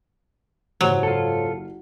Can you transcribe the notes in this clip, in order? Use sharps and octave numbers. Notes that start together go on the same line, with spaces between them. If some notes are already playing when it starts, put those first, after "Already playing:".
F#1 G#2 F#3 G4 C5 C#5
F4 A4